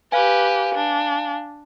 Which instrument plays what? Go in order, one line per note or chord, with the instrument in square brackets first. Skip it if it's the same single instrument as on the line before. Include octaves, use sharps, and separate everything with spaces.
[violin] G4 B4 [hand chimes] F5 G#5
[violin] D4